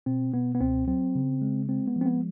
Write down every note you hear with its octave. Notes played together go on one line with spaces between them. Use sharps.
B2 C4
B2 B3
B3
C#2 C4
F#3 C4
C#3
G#3
G#3 C4
B3
F3
C4
B3